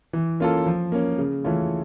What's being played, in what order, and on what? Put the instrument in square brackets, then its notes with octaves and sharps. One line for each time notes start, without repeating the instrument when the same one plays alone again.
[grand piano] E3
A#3 C#4 F4 A4
F3
A#3 C#4
C#3
E3 A3 C#4 F4